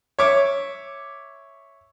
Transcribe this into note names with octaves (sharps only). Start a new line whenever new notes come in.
C#5 E5 D6